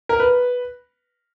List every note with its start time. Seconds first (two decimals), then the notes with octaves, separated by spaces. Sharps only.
0.09 A#4
0.20 B4